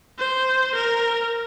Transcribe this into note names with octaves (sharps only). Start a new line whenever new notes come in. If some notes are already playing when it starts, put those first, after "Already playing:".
C5
A#4